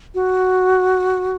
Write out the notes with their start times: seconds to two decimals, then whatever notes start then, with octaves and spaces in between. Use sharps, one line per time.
0.15 F#4